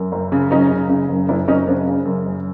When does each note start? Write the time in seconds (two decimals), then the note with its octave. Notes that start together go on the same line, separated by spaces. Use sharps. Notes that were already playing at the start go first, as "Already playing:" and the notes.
Already playing: F#2
0.12 F#1
0.32 C#3
0.51 F#1 C#4 D#4
0.71 C#3
0.89 C#3
1.09 F#1
1.28 F#1 D4 E4
1.48 F#1 C#4 D#4
1.67 C#3 C4 D4
1.86 C#3
2.05 F#2
2.26 F#1